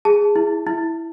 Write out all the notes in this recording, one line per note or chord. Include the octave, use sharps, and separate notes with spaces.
G#4 A5
E4
E4